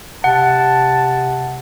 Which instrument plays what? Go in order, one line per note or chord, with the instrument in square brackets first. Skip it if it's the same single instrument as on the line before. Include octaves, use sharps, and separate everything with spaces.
[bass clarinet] C3 [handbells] F#5 [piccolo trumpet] A5